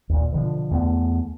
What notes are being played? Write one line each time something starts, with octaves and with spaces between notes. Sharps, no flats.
D#2 A#2
B2 D3 F3
E2 A3 B3